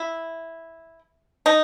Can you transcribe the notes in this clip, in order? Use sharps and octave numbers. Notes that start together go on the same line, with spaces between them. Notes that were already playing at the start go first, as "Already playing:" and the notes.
Already playing: E4
D#4